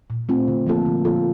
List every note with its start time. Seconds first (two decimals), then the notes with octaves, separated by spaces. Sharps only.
0.10 A#2
0.29 A3 C4 F4
0.48 D3
0.66 F3 A#3 F4 A4
0.86 D3
1.04 F3 A#3 F4 A4